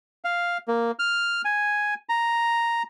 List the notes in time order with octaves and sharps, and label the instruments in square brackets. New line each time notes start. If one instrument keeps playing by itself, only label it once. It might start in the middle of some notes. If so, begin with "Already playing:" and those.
[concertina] F5
A#3
F6
G#5
A#5